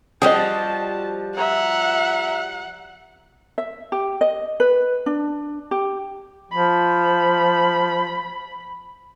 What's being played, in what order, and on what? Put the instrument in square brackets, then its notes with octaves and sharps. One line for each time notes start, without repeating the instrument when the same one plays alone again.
[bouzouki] F3 G3 F#4 [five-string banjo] G#4 D#5 [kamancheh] A5
[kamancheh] E5 A#5 [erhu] F#5
[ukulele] E5
G4
D#5
B4
D4
G4
[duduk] F3 [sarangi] B5